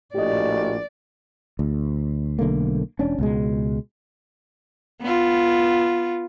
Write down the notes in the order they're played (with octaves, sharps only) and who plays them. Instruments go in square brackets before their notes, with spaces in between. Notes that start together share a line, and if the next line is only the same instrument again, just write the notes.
[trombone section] A#1 A2 F#4 [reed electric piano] G4 D#5 [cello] D5
[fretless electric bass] D2
B1 D3 A3 A#3
E1 C#4 D4
C#2 B2 G#3
[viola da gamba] B3 F4